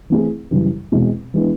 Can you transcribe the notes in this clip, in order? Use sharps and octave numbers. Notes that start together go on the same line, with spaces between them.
E3 A3 C4 E4 G#4
F#2 C#3 E3 G3
E2 B2 G#3 C4
E3 G#3 B3 D4